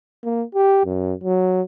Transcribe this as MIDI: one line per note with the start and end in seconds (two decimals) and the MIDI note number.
0.24 0.43 58
0.55 0.81 67
0.86 1.13 42
1.24 1.62 54